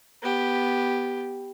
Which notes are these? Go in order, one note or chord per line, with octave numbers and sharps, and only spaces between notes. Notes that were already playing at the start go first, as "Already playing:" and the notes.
B3 G4